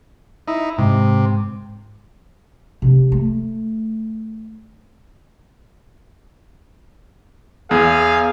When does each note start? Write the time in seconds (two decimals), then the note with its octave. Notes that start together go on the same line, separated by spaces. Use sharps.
0.48 D#4 E4
0.78 G#2 C3
2.82 C3 D4
3.12 A3
7.71 E2 G#4 F5